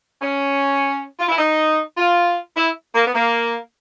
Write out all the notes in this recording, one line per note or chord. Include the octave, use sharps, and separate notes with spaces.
C#4
F4
E4
D#4
F4
E4
A#3
B3
A#3